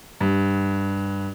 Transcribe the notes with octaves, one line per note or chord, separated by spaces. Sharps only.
G2